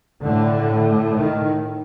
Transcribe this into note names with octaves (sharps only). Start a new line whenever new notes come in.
A2 D3
D#3